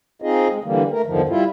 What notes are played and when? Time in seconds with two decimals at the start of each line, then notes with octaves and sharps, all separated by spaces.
0.22 C4 D#4 F4 G#4 D#5
0.50 G#3
0.64 D3 E3 G3 A#3
0.92 A3 A#4
1.06 E2 G2 D3 D#3 F3
1.29 G3 E4 F4